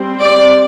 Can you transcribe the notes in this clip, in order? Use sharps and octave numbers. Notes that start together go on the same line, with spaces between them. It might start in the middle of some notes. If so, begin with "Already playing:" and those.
Already playing: G3 C4
D5